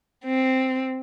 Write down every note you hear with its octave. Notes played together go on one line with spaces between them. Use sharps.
C4